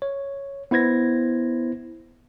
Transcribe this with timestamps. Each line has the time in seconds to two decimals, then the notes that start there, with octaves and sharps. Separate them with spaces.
0.02 C#5
0.71 B3 E4 C5 G#6 A#6